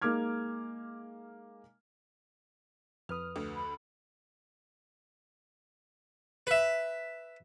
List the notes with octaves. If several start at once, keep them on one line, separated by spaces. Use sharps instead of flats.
G#3 A#3 D#4 D6 F6 G#6
F2 B4 D#6 F6
D2 D3
B5
B4 E5